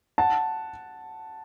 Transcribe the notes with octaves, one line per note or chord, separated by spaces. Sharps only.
F#5 A5